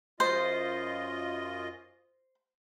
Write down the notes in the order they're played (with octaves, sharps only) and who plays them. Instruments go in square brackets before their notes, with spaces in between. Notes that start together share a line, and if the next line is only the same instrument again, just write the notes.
[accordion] F#2 F4 D#5 [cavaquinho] C5